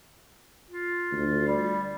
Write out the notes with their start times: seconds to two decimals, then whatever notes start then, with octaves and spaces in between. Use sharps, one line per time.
0.70 F4
1.12 D2
1.47 G3